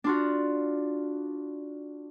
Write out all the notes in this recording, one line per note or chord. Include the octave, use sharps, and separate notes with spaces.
D4 F4 F#4